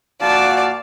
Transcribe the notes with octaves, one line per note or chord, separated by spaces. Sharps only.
A#2 F#4 D5 F5 A5